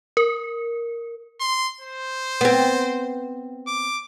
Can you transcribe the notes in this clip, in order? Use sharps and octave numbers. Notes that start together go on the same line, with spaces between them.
A#4
C6
C5
B3 C4
D6